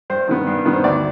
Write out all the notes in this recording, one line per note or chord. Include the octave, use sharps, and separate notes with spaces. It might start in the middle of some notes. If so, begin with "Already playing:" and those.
G2 C5
D#3 B3
G2
D#3 B3
C5
D2 D5